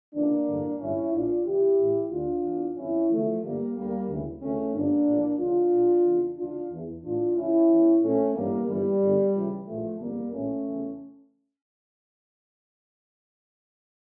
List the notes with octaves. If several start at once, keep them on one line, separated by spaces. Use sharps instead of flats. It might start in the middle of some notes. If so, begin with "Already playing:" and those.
C#2 C#3 E3 A#3 D4
A1 G2 D3
A1 G2 D3 C#4 E4
A#1 A#2 D4 F4
C#2 C#3 E3 E4 G4
A1 A2 E3
D2 D3 D4 F4
E2 E3
G1 F2 E3 C#4 E4
E2 D3 F3 A3
G1 G2 D3 G3 A#3
D2 D3 G3 A#3
D2 C#3 E3
D2 C#3 E3 A3 C#4
G1 G2 D3 A#3 D4
A#1 A2 E3
C#2 C#3 E3 D4 F4
A#1 A#2
E2 C#3 E3
C#2 C#3 E3 D4 F4
E2 E3
A1 A2 E3 D4 F4
C#2 C#3 E3 C#4 E4
E2 E3
A#1 A#2 A3 C#4
A1 G2 E3 G3 A#3
G1 G2 E3 G3
G1 G2 D3
C#2 C#3 E3
A#1 A2 E3 F3 A3
G1 F2 C#3 E3 G3 A#3
A#1 A2 E3 A3 C#4
E2 C#3 E3